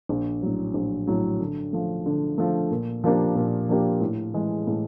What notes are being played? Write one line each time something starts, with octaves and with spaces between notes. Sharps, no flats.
A#1
A2 F#3
A#1
A2 F#3
D3
F3 A3
D3
F3 A3
A#2
F3 A#3 D4 G4
A#2
F3 A#3 D4 G4
A2
E3 G#3
A2